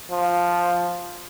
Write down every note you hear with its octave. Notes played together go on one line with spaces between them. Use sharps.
F3